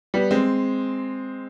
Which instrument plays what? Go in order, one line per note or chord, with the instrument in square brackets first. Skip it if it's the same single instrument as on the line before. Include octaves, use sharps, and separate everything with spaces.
[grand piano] G3 B3
G#3 C4